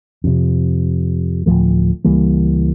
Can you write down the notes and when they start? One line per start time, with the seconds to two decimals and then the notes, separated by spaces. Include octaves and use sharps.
0.24 F2 C3
1.46 D1 E2 F3 A3
2.05 C#2 E3 G3 A#3